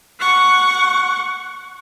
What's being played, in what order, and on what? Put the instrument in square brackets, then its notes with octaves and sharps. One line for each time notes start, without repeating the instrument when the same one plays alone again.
[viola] F#5 C#6